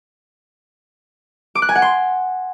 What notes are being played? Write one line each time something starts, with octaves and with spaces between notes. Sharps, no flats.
D6
F#6
G#5
F#5
C6